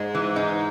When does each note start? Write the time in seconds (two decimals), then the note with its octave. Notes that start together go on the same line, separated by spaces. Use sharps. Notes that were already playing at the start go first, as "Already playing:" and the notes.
Already playing: G#2 G#3
0.15 E3
0.36 D#4